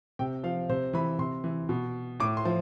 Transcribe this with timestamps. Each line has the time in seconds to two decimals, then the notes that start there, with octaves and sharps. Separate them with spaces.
0.19 C3 G5
0.44 F3 F5
0.69 C3 C5
0.93 E3 B5
1.19 C3 C6
1.44 E3
1.69 B2
2.20 A2 D6
2.37 C6
2.45 F3